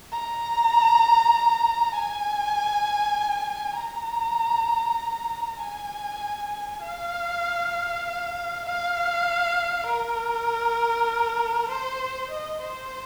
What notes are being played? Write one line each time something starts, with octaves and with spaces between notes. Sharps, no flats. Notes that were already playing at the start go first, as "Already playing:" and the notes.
A#5
G#5
A#5
G#5
F5
F5
A#4
C5
D#5
C5